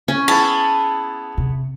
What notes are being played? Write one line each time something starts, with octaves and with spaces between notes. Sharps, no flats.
C#4
B3 E4 G#4 A5
C3